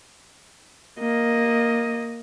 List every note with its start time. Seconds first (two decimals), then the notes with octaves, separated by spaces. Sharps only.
1.00 A#3 D#5